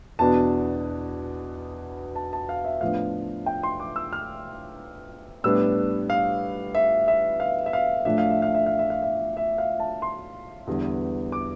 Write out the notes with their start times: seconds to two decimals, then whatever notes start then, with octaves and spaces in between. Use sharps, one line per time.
0.19 E2 B2 B3 D4 A5
2.15 A5
2.33 A5
2.49 F5
2.65 E5
2.81 A2 F3 B3 D4 F5
3.46 G5
3.63 C6
3.80 D6
3.96 E6
4.13 F6
5.44 A2 G3 B3 D4 E6
6.10 F5
6.75 E5
7.08 E5
7.40 F5
7.66 E5
7.73 F5
8.05 A2 F3 A3 D4 E5
8.18 F5
8.30 E5
8.42 F5
8.55 E5
8.66 F5
8.79 E5
8.90 F5
9.02 E5
9.37 E5
9.58 F5
9.80 A5
10.02 C6
10.67 E2 D3 G3 B3
11.32 D6